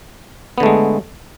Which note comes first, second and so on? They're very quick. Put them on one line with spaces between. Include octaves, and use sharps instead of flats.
B3 D3 A3 G#3